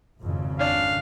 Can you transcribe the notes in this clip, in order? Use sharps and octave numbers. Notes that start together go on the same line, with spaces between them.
G#1 F2 C#3
C#4 D4 F5